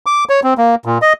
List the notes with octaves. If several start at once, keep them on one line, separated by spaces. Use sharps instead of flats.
D6
C#5
C4
A#3
A#2
D#5